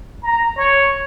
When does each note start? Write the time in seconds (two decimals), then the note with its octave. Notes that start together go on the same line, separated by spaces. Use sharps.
0.23 A#5
0.56 C#5